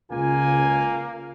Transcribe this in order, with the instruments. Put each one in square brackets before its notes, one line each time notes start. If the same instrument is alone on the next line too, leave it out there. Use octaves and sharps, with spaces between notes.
[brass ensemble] C#2 G#5 [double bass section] C#3 [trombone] A#3 [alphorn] F4